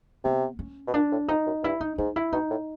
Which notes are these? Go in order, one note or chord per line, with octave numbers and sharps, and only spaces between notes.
C3 B3
C#4
B2
A#2 D4
A2
F2 D#4
F#2
G2 E4
D#4
G#2 D#4
E4
B2 D#4
A2